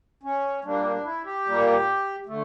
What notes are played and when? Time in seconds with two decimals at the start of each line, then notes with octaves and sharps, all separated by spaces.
0.23 C#4
0.64 A#2 G3 A#3 D4
0.85 D4
1.04 E4
1.25 G4
1.46 A#2 G3 A#3
2.26 D3 A3